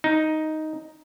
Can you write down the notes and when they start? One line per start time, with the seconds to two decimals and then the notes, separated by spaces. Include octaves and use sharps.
0.04 D#4